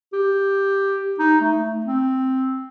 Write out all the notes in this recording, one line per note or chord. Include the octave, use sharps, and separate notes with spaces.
G4
D#4
A3
C4